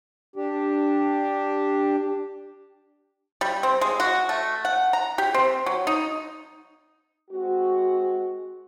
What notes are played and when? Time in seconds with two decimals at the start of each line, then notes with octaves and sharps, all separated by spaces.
0.36 D4 G4
3.41 G3
3.63 C4
3.81 G#3
4.00 F#4
4.29 A3
4.65 F#5
4.93 A#5
5.18 G4
5.34 C4
5.66 F#3
5.87 D#4
7.31 G#3 C4 F#4